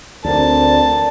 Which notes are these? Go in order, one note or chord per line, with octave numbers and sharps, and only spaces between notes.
D2 D3 C4 A#4 D5 A5